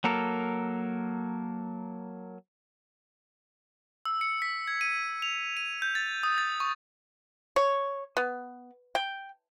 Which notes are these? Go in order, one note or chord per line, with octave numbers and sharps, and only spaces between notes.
F#3 A#3 A4 A#4
E6
C#7
B6
G#6
D#7
F7
D#7
G6
A6
D#6
A6
C#6
C#5
B3
G5